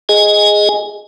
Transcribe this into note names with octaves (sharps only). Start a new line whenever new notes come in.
G#4 D#5 G#5